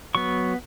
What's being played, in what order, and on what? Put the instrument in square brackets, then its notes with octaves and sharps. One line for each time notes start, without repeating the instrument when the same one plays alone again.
[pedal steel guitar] F#3 B3 C#6